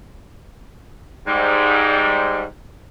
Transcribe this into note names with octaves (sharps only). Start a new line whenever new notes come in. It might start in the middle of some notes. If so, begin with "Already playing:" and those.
G#2 G3